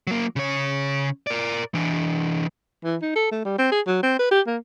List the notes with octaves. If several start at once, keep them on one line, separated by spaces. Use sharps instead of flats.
F#3 A#3
C#3 C#5
A#4 D5
E3 D4
E3
D#4
A4
A3
G3
C4
G#4
F#3
C4
B4
G4
A#3